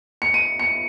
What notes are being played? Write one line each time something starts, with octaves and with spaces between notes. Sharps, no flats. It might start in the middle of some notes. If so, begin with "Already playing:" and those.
C#7
D#7
C#7